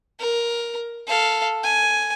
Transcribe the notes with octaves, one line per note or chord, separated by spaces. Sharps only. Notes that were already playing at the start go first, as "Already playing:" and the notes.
A#4
A4 F5
G#5